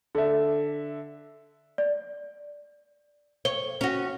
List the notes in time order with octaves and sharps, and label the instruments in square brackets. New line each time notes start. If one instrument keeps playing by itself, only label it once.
[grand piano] D3 E5
[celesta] D5
[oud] C#5 [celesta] G7
[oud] C#4 F#4